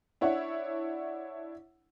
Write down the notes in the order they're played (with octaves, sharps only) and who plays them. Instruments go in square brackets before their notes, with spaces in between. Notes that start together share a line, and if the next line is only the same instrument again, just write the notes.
[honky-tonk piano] D4 E4 C#5 F#5